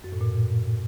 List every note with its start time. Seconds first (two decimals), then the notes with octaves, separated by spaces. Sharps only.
0.04 F#2
0.12 A2
0.21 A#2